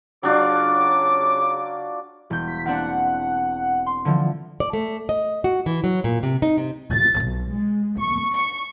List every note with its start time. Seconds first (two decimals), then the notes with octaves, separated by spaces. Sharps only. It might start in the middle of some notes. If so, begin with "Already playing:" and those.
0.23 C#3 F#3 D4 F4 D6
2.30 E1 G6
2.47 B6
2.66 A#3 C4 D4 F#5
3.86 C6
4.05 D3 E3 F3
4.60 D5
4.73 A3
5.09 D#5
5.44 F#4
5.66 E3
5.84 F#3
6.04 A#2
6.23 C3
6.42 D#4
6.57 C3
6.92 A6
7.21 B1
7.53 G#3
7.99 C#6
8.34 C#6